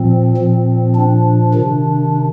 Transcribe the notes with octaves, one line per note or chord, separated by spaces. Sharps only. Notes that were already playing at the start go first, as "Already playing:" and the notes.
Already playing: A#2 F3 C4
A#2 F3
D4
C3 D#3